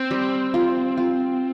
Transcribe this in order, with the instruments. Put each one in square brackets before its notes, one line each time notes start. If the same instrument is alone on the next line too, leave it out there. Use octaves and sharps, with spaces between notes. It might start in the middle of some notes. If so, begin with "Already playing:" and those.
Already playing: [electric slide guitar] C4
[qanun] G3
F4
F4